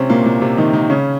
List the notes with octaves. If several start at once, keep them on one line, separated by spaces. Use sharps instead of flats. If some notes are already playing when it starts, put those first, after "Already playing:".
Already playing: C3 C4 C#4
A#2 A#3
A#2 A#3
C3 C4
D#3 D#4
D#3 D#4
C#3 C#4